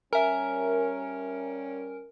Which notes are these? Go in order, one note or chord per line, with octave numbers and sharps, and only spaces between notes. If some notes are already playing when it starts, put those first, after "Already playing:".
G3 C#4 A#4 E5 G#5 A#5 F6